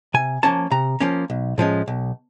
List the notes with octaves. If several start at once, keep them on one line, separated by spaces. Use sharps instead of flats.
C3 G#5
F3 A#3 C#4 A5
C3 A#5
F3 A#3 C#4
B1
A2 F3 G#3 C#4
B1